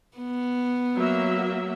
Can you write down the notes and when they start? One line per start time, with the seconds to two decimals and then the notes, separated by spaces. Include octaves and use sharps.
0.18 B3
0.96 F#3 A#3 E5